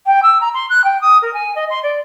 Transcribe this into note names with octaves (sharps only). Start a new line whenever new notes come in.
G5
E6
A#5
C6
F#6
G5
D#6
A#4
G#5
D#5
C6
D5